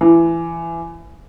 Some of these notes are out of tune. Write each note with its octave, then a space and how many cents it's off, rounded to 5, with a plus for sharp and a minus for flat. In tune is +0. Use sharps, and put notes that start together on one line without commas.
E3 +20